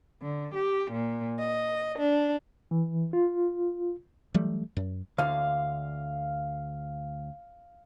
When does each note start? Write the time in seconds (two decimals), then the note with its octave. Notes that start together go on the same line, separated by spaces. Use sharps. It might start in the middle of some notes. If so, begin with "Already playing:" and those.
0.22 D3
0.54 G4
0.91 A#2
1.38 D#5
1.98 D4
2.71 E3
3.13 F4
4.34 E3 F#3 G3 A3
4.77 F#2
5.18 D2 D3 F5